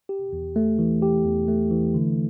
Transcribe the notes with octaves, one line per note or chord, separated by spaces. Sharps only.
G4
E2
A3
E3
G4
E2
A3
E3
D3